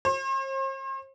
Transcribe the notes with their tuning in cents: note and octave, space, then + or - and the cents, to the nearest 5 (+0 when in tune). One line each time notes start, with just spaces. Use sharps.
C5 +45